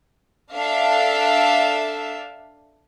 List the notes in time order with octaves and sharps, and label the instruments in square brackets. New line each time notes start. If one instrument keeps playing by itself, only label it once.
[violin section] D4 A4 E5 F5